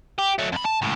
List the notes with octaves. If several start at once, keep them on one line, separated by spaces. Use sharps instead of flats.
G4
F#3 A3
F2 B5
A5
C#2 A2